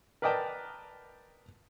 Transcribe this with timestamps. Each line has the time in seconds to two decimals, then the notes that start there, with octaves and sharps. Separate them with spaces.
0.22 A#4 B4 D5 D#5 G5 A5